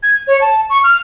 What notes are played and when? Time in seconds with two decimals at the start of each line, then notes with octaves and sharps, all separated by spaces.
0.03 G#6
0.27 C#5
0.41 A5
0.70 C#6
0.84 F6